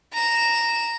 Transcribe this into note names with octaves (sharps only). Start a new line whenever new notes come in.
A#5 E7